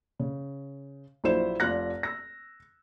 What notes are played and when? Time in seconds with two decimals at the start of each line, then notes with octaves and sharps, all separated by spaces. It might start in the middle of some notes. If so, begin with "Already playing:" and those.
0.19 C#3
1.24 A#1 F#3 E4 F4 C5 E7
1.60 F1 F4 D5 F6 F#6 A#6
2.03 E6 A#6